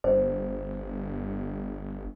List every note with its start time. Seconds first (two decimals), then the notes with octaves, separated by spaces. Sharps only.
0.04 G1 C5